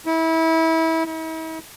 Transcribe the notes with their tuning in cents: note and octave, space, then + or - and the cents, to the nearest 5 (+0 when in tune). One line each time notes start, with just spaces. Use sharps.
E4 -25
E4 -45